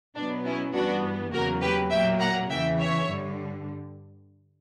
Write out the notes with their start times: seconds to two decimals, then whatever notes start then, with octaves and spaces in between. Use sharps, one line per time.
0.16 B2 F#3 B3 D4
0.46 C#4 E4
0.74 G2 E3 G3 B3 D4 F#4
1.32 E2 C#3 F#3 A#3 F#4 A#4
1.62 G4 B4
1.91 A#2 F#3 A#3 E5 G5
2.20 F#5 A#5
2.50 E2 C#3 E3 E5 G5
2.78 C#5 E5
3.08 G2 D3 G3